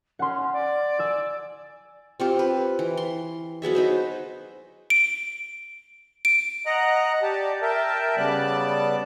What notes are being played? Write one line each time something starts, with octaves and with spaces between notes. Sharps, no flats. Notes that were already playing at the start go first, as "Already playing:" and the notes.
C#4 F#5 C6
D5
G#5 E6
C4 F4 G4
B4
E3
C6
F#3 B3 G#4 E5
D#4 B4 C5
D7
D7
D#5 F#5 A#5 F#6
G4 D5 A5
A#4 E5 G5 A5
C#3 G3 B3 D5 A5 F#6